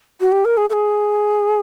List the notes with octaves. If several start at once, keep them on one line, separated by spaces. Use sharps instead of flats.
F#4
G4
A#4
G#4
A4
G#4